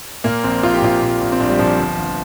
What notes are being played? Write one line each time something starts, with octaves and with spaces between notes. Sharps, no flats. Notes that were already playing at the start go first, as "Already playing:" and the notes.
A#2 A#3
A#1 C4
A#1 F4
G4
A#2 F4
A#2
A#1
C4
A#1 D4
G3
A#2 F3
G1
G1